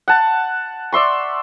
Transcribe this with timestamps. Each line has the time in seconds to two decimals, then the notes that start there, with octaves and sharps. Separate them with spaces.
0.08 F#5 A5
0.92 D5 E5 C6 C#6